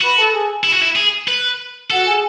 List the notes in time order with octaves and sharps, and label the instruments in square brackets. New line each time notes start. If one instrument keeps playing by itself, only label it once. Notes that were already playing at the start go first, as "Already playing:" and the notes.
[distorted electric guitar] F#4 [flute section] B4 B5
[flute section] A4 A5
G#4 G#5
[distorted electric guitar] E4
F#4
E4
G#4
B4
[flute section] F#4 F#5 [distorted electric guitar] A4
[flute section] G#4 G#5